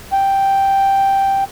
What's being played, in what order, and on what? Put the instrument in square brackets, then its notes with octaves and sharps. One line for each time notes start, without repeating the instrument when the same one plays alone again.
[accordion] G5